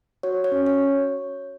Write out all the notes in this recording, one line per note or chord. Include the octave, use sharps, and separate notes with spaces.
F#4 C#5
C#5
C#4
C#5